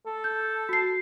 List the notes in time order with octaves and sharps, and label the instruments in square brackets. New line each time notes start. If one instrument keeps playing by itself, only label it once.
[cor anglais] A4
[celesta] G6
F#4 C7